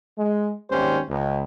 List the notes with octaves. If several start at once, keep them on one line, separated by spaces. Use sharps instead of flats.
G#3
G#1 D#2 G3 C#4 G4 C5
C#2